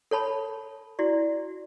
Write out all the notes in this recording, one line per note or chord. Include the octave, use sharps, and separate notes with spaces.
A4 C#5 A5 B5
E4 F#4 D5